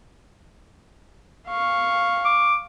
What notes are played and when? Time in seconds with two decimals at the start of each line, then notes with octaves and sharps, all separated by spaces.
1.48 F5 C#6
2.25 D6